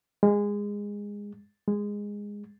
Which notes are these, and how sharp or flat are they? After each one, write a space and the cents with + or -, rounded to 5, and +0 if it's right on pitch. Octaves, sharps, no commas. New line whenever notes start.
G#3 -20
G#3 -15